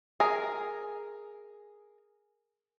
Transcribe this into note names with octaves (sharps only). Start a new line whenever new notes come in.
G#4 A#4